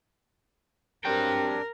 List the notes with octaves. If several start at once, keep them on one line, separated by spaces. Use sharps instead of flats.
F#3 C4 D4 G4 A#4 G5